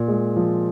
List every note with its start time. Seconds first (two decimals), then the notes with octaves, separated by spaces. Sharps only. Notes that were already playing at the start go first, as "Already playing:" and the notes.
Already playing: A#2
0.08 G#3
0.36 F3